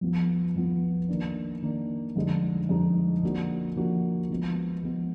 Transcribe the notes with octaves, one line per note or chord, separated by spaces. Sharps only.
F2 F3 B3 F4
F2 F3 B3 F4
D#3 A#3 D4
D#3 A#3 D4
F2 D3 G#3 D#4
F2 D3 G#3 D#4
F3 A#3 D4 F#4
F3 A#3 D4 F#4
F3 G#3 B3
F3 G#3 B3